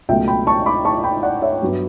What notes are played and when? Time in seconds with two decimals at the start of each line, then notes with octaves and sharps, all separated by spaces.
0.09 C#2 B2 F#3 A3 E5 G5
0.28 G5 B5
0.47 A5 C#6
0.66 B5 D6
0.85 A5 C#6
1.04 G5 B5
1.23 D5 F#5
1.42 C#5 E5
1.62 G2 F#3 B3